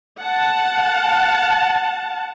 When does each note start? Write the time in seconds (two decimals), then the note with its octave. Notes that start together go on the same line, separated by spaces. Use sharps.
0.20 F#5 A5